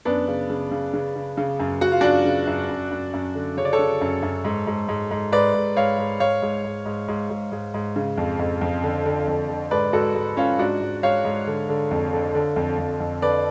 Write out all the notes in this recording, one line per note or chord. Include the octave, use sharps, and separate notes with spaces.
F#2 B3 D4
C#3
C#3
C#3
C#3
C#3
C#3
F#2
C#3 F#4
F4
F#2 D4 F#4
C#3
F#2
F#2
F#2
F#2
D3
C#3 C#5
D5
A4 C#5
C#3
F#2
F#2
G#2
G#2
G#2
G#2
G#2 B4 D5
G#2
G#2 C#5 F5
G#2
G#2 C#5 F5
G#2
G#2
G#2
G#2
G#2
G#2
G#2
C#3
F2
F2
F2
D3
D3
F2
D3
G#2 B4 D5
G#2 F#4 A4
G#2
G#2 C#4 F4
G#2 D4 F#4
G#2
G#2 C#5 F5
G#2
D3
D3
F2
D3
D3
F2
F2
F2
D3 B4 D5